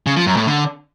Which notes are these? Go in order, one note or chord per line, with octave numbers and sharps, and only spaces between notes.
C#3
F3
F#2
A2
D3